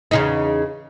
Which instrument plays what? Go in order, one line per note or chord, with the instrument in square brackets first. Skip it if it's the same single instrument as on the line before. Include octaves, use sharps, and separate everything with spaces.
[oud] E2 C#3 D#4